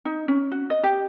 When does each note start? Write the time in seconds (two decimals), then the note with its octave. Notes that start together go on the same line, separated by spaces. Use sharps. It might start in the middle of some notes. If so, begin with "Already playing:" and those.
0.05 D#4
0.28 C#4
0.52 F#4
0.70 D#5
0.83 G4